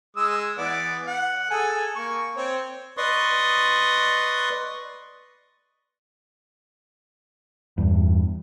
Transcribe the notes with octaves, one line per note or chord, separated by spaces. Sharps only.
G#3 D#6 E6
E3 B3 D5
F#5
G#4 A4 G#5
A#3 C#6
C4 C#5
B4 D5 D#5 C6 C#6 D#6
E2 G2